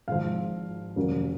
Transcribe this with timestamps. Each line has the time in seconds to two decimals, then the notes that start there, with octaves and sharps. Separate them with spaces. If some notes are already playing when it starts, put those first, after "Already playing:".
0.08 G#1 G#2 F3 F5
0.96 F1 D#2 C#3 F#3 A#3